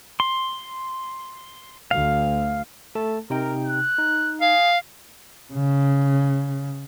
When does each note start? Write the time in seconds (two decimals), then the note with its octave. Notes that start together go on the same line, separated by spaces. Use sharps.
0.20 C6
1.91 D2 F5
2.95 A3 A4 A5
3.30 C3 D#4 A#4 G5
3.66 F#6
3.98 D#4
4.41 G#4 F5
5.53 C#3